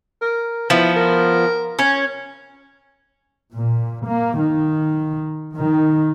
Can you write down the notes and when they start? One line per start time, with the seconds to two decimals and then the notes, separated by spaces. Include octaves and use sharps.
0.22 A#4
0.70 F3 B3 E4
0.96 A#4
1.79 C#4
3.55 A#2
4.07 A#3
4.39 D#3
5.56 D#3